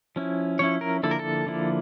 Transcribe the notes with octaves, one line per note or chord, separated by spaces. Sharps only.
F3 C#4 E4
F3 C#4 E4 C#5
A#4
D3 F3 A#3 E4 A4
A#4
A4
D3 F3 A#3 E4